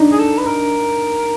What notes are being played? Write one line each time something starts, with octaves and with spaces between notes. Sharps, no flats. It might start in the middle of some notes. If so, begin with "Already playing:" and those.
Already playing: D4 D#4
G#4
A4
B4
A#4